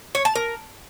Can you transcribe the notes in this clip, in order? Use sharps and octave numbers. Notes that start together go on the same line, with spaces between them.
C#5
A5
A#4